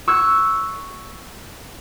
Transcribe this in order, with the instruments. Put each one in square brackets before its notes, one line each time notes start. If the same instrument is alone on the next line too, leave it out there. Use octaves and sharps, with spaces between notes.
[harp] C#6 E6 F#6 G#6 C#7